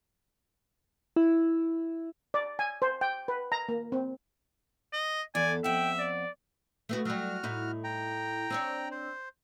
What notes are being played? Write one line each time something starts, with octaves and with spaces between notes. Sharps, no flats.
E4
D5
G#5
C5
G5
B4
A#5
A#3
C4
D#5
E2 A4 D5 G#5
F2 E5 F#5 G5
D5
A3 B3 F#4
F#3 G3 F#4 F6
A2 D#4 E4
G5 A#5
C4 D4 C#5
C5